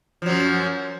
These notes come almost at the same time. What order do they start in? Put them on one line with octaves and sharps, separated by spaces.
F3 F#3 F#2